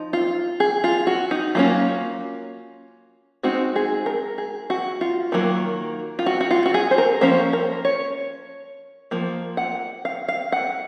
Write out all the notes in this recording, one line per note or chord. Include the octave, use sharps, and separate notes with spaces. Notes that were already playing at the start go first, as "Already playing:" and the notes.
Already playing: F3 D#4
F4
G#4
F4
F#4
D#4
F#3 A#3 C#4 F4
G#3 C4 D#4 F#4
G#4
A#4
G#4
F#4
F4
D#3 F#3 A#3
F4
F#4
F#4
F4
F#4
G#4
C5
A#4
F3 A#3 C#4 C5
A#4
C#5
F3 A#3
F#5
F5
F5
F#5